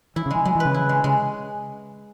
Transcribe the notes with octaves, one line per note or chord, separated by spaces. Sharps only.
E3 E4
C#3
E3 G#3
F#3 G#3
E3
B4
C#3
E4
G#3
C#3 G#3